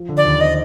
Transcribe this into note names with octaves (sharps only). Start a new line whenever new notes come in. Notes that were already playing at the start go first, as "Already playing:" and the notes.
Already playing: F3
D3
D5
D#2
C4 D#5